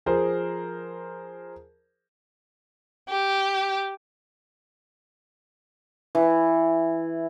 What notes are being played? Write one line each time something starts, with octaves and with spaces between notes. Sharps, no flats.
F3 G#4 A#4 C5
G4
E3